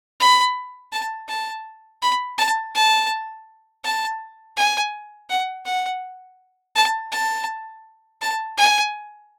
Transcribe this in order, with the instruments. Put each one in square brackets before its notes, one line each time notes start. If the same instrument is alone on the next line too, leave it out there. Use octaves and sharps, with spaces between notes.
[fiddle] B5
A5
A5
B5
A5
A5
A5
G#5
F#5
F#5
A5
A5
A5
G#5